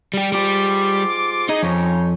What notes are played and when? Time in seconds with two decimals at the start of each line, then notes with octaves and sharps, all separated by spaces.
0.14 G3 G4
0.32 G#2 G3 F4 G4 D6
1.49 D#4 G#4 D#5
1.63 F2 C#4 D#4 C#5